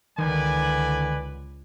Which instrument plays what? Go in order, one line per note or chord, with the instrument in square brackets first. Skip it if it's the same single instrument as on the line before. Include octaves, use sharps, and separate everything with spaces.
[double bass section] C#2 [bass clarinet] D3 [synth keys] D#3 [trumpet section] B4 D5 G#5